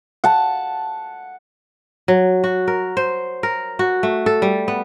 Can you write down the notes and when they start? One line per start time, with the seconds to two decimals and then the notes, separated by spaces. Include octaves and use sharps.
0.24 F#5 A5
2.08 F#3
2.44 F#4
2.68 A#4
2.97 C5
3.43 A#4
3.79 F#4
4.03 A3
4.26 A4
4.42 G3
4.68 B3